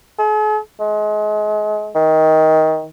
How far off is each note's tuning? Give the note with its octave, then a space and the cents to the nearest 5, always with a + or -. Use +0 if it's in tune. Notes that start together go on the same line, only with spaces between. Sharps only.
G#4 +45
G#3 +30
D#3 +20